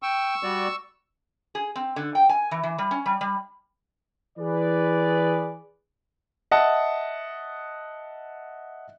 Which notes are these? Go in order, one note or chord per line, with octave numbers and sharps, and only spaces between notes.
G5 C#6 E6
G3 F#4 D5
G#4
C4
D3
G5
G#5
E3
E3
G3
C#4
G3
G3
E3 G#4 B4 D5
D#5 E5 F#5 A5